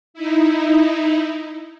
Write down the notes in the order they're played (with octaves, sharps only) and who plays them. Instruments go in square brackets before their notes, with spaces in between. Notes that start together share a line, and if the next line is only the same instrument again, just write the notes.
[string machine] D#4 E4